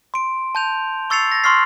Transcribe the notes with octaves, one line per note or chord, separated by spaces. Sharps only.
C6 D7
A5 G6 F7
C#6 E6 A6 C7 C#7 F7
A6 A#6
C6 C#6 F6 C7